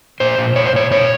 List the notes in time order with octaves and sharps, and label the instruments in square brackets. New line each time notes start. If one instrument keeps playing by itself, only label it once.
[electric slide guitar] A#2 C5
A#2
A#2 C#5
C5
A#2 C#5
A#2 C#5